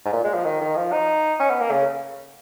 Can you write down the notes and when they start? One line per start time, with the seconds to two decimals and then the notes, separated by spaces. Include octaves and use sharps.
0.05 G#2
0.13 A#2
0.24 G#3
0.34 F3
0.45 D#3
0.61 D#3
0.76 F3
0.92 D#4
1.40 C#4
1.50 B3
1.61 A#3
1.71 C#3